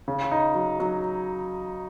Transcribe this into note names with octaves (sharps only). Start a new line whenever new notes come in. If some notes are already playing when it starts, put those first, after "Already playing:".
C#3
D#4
F#3
F#3